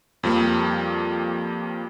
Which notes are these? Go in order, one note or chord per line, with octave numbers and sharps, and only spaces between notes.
F2 F3 G3 A#3